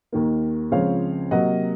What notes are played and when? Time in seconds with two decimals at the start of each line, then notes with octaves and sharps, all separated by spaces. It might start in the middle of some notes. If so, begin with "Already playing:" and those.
0.13 D#2 D#3 A#3
0.71 C#2 C#3 F3 C4 C#5 F5
1.31 C3 F#3 A#3 D#5 F#5